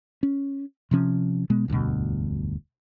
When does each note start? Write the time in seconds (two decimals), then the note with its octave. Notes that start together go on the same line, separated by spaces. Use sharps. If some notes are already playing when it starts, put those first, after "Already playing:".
0.23 C#4
0.91 C3 F3 C#4
1.50 B2 G#3 B3
1.68 E1 D2 G2 B2